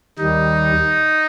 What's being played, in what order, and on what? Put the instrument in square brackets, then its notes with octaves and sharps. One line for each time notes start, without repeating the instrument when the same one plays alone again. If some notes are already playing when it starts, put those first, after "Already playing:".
[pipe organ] D#2 D#3 G3 [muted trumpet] D#4